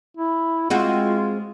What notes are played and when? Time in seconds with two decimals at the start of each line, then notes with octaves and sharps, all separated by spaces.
0.17 E4
0.70 G#3 C4 F4 F#4